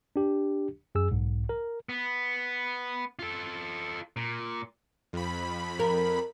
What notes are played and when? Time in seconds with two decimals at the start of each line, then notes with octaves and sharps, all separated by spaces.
0.16 D4 G4
0.95 F#2 G#4 E6
1.12 B1 G#2
1.49 A#4
1.89 B3
3.19 F4 A4
4.17 A#2
5.13 F2 B5
5.80 A#4